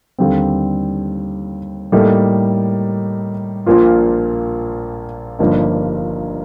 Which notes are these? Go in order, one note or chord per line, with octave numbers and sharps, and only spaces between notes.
D#2 D3 G3 C4
A2 G3 A#3 D#4 A4
A#1 A#2 F3 A#3 F4
G1 G2 F3 A#3 D#4